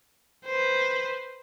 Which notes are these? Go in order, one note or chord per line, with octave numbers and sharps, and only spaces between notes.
B4 C5